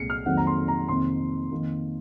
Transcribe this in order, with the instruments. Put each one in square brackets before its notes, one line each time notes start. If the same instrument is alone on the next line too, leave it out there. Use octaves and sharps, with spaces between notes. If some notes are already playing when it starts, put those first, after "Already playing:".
Already playing: [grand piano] C2 A#2 G#3 C7 C#7
F6
F2 D#3 F#3 A#3 F#5
A#5
C6
A#5
F2 C3 D#3 A#3 C6
F2 D#3 A#3